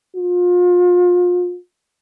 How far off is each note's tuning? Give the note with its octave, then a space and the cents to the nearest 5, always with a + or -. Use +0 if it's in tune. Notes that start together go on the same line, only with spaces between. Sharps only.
F4 +30